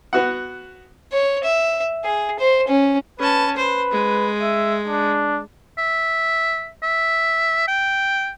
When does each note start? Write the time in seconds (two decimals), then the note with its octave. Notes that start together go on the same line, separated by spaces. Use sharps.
0.13 B3 F#4 F#5
1.12 C#5
1.44 E5
2.04 G#4
2.39 C5
2.68 C#4
3.19 C#4 B4 A5
3.56 B4 C5
3.92 G#3
4.42 E5
4.87 D4
5.78 E5
6.83 E5
7.68 G5